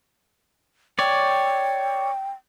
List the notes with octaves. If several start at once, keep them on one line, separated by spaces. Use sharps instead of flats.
C#5 D5 G5